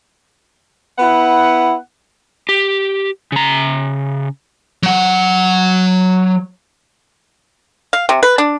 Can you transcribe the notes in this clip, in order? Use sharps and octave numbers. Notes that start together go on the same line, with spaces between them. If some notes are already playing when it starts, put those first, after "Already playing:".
B3 E4 F#5
G4
C#3 A#5
F#3 F#5
F5
C3
B4
D4